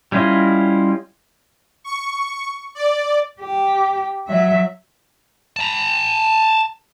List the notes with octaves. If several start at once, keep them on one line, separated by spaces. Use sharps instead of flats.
G3 C#4 E4 F4 D#5
C#6
D5
G4
F#3 E5
A5 A#5